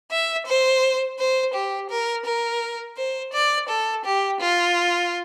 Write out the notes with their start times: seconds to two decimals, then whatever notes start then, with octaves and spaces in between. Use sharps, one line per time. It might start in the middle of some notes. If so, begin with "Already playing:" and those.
0.11 E5
0.47 C5
1.19 C5
1.54 G4
1.90 A#4
2.25 A#4
2.97 C5
3.33 D5
3.69 A4
4.05 G4
4.41 F4